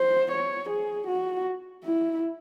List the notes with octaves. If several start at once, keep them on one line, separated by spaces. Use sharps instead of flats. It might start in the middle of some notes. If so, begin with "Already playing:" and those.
Already playing: C5
C#5
G#4
F#4
E4